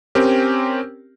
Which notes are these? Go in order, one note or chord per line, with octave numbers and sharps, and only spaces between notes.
C4 C#4 G4 A#4